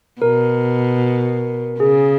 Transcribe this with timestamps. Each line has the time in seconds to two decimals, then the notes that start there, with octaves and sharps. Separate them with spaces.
0.21 B2 A#4
1.80 C#3 G#4